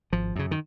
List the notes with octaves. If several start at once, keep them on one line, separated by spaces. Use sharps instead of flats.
G#1 F3
F#2 C#3
D#3